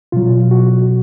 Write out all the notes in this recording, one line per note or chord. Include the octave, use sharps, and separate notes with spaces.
B2 F#3 F4
F#4